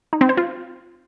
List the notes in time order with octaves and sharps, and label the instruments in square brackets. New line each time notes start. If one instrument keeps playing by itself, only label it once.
[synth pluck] D#4
C4
C5
F4